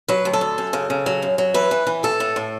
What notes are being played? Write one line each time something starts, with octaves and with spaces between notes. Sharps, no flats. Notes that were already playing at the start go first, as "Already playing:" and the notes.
F#3 B4
D2
A4
D2
F#2
C#3
C#3
F#3
F#2
F#3
E3 B4
E3
E3
A2 A4
A2
A2